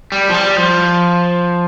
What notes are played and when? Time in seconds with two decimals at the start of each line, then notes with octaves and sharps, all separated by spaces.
0.12 G3
0.29 F3
0.34 G3
0.57 F3